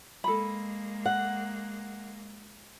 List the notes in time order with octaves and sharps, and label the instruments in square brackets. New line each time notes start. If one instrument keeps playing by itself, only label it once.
[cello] G#3 A#3 [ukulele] A4 B5
[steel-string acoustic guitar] F#5